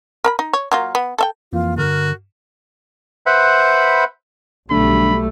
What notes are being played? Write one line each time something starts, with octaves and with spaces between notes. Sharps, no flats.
A#4 A#5 B5
D#4
C#5
F#3 A#3 F4
B3
A4 E5 G5
F2 E3 A#3 F4
G2 D3 F#4 A#4 F6
B4 C5 E5 F#5 B5
B1 D3 G3 A3 B5